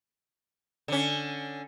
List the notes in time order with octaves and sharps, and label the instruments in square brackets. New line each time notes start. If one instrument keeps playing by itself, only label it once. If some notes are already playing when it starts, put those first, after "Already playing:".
[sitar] D3 C#4